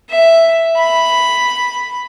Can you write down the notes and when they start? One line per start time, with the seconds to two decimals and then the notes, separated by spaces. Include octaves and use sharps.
0.10 E5
0.77 B5